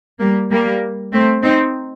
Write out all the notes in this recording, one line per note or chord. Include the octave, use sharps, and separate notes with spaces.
G3 A#3
G3 A#3
A3 C4
C4 D#4